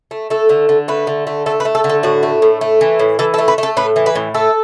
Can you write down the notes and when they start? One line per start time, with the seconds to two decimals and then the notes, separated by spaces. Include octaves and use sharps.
0.11 A3
0.30 A3 A4
0.49 D3
0.69 D3
0.88 A3 B4
1.07 D3
1.27 A3
1.46 A3 A4
1.60 B4
1.65 A3
1.75 A4
1.84 D3
1.89 A4
2.03 A2 F#4
2.23 A3
2.42 A2
2.61 A3
2.81 E3
2.99 A2
3.19 E3 A4
3.34 A4
3.38 A3
3.48 B4
3.58 A3 A4
3.77 A2 B4
3.96 E3
4.06 B4
4.15 A2
4.34 A3 A4